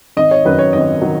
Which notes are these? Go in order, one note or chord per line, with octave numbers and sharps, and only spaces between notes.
G#1 D#5
C#5
F#2 D#3 F#3 B4
C#5
G#1 D#5
D#3 F#3